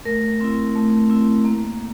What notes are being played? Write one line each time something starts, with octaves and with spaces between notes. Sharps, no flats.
A3 A#4
C4 E4
A3
C4 E4
A#3